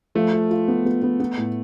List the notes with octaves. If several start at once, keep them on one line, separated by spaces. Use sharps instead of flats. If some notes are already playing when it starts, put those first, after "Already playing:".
F3 A3
F4
F4
B3
B3
B3
B3
A2